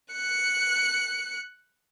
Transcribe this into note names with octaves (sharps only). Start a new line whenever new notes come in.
F#6 C#7